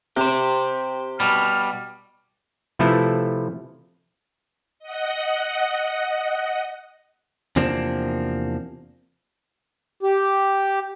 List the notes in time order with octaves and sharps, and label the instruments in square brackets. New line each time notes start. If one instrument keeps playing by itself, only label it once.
[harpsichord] C3 [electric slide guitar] G4 C5
[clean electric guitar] B2 G3 [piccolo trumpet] F6
[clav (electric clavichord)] C3 F3 A3 E4 A4 B4
[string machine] D#5 F#5
[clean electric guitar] E2 C3 F3 A#3 C4 D4
[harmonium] G4